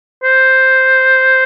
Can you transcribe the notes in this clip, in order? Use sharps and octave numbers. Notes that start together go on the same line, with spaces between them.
C5